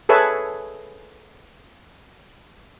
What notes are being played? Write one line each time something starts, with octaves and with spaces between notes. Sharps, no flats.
G#4 A4 B4 C#5 E5 A5